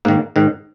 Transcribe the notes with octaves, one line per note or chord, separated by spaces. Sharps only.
G#2 D#3 A#3
G#2 D#3